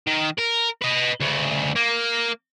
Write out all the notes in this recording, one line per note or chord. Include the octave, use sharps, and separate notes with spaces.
D#3
A#4
B4 D#5
D2 C#3
A#3